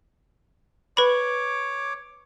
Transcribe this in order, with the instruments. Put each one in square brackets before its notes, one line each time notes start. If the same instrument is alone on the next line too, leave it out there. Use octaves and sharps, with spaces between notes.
[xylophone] B4 B5 [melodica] C#5 D6